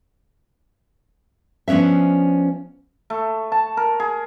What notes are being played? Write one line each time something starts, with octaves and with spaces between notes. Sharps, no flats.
F3 B3 C#4 D4 E5
A3
A5
A#4
G#4